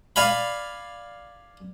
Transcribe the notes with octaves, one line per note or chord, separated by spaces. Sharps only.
D5 F5 G#5 B5